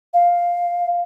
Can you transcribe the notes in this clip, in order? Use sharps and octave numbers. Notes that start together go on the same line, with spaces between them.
F5